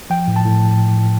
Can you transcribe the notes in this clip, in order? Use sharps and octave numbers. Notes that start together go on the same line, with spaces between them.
F3 G5
A2
A5
A2